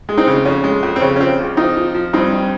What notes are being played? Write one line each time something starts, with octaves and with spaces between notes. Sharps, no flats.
G#3
C4 D#4
C#3
F2 C#4
G#3
F2
C4
C#3 C#4
C#4
F3 C4
C#2
F3 C4 D#4
F3
F3
G2 C4 D#4
G2